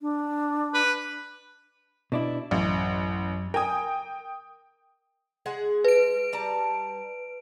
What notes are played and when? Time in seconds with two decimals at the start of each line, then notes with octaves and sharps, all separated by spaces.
0.01 D4
0.74 B4
2.12 B2 D4 E4
2.51 A1 F#2
3.54 A#4 G5 G#5 D#6
5.46 G#3 G#4 F#5
5.85 B4 D7
6.33 G3 A5 A#5